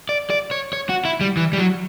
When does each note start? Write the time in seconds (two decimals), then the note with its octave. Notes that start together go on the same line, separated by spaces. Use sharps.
0.09 D5
0.30 D5
0.51 C#5
0.73 C#5
0.89 F#4
1.05 E4
1.21 G3
1.37 E3
1.53 G3
1.58 F#3